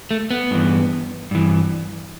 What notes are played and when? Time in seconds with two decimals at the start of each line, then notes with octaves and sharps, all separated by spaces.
0.11 A3
0.31 B3
0.51 G2 E3
1.31 G2 E3